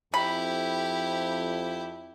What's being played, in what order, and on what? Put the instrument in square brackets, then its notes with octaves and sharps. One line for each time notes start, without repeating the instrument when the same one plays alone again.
[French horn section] F2 [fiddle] E4 G4 [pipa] B5